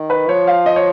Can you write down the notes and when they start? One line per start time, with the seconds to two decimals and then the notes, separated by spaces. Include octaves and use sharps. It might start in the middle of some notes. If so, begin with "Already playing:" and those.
Already playing: D#3
0.10 B4
0.29 F3 C#5
0.47 F5
0.66 D#5
0.76 C#5